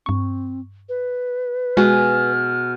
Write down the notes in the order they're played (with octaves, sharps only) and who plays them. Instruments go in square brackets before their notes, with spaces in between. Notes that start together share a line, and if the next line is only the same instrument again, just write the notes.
[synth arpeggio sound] G2 C#6 [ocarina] C4
[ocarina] B4
[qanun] B2 G#4 [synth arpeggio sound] G#3 F#4 [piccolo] F6